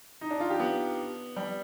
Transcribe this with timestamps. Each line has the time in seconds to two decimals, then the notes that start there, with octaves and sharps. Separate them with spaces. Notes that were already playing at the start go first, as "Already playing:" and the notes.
0.21 D#4
0.31 D4
0.40 F4
0.50 G4
0.60 B3
1.36 G3